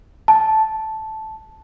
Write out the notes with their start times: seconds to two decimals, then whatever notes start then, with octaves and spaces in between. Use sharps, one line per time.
0.28 A5